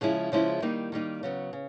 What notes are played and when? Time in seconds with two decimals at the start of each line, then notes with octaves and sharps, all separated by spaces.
0.01 C#3 F3 G#3 C#4 E4
0.32 C#3 F3 G#3 C#4 E4
0.62 D#3 G3 A#3 D#4
0.92 D#3 G3 A#3 D#4
1.23 C#3 F#3 B3
1.53 C#3